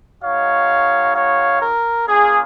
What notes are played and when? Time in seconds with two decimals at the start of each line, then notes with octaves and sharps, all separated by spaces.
0.22 G#3 D#4 F#4 C#5 F5
1.14 C#5 F5
1.61 A#4
2.07 A#3 C#4 F4 G#4